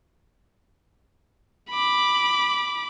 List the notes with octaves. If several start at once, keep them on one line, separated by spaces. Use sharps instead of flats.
B5 D6